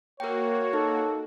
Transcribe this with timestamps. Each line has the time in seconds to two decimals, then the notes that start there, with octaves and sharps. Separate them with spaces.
0.20 A#3 F#4 A#4 C#5 G5
0.73 D#4 A4